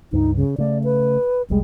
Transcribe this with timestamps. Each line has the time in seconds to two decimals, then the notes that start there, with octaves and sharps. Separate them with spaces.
0.13 C#2 G2 D#4
0.36 C#3
0.58 C#3 A3 D5
0.84 B4
1.50 F1 C2 G3 G#3